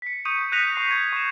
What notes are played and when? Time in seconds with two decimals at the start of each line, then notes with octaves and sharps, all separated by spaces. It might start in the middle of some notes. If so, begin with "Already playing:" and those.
0.02 B6 C#7
0.25 C#6 D#6 G6 C#7 D#7
0.52 F#6 G6 A#6 B6 D#7 F7
0.76 C#6 C7
0.91 G#6 F7
1.13 C#6 E7